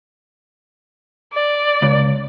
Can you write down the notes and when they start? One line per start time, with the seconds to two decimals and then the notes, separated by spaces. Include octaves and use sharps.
1.33 D5
1.82 C#2